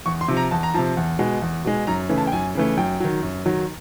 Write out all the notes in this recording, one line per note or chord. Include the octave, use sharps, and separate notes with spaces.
E2 C#6
C6
C3 F3
A#5
E2 A5
A#5
C3 F3 A5
E2
B2 G#3
E2
B2 G#3
F#2 A#5
C#3 E3 A3
A5
G5
F#2 G#5
C#3 E3 A3
F#2 G5
D#3 F#3
F#2
D#3 F#3